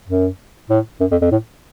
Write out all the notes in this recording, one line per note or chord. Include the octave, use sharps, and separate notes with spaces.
F#2
A2
F#2
F2
F2
A2